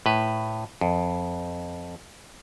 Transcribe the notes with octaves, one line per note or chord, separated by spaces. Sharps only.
A2 B4
F2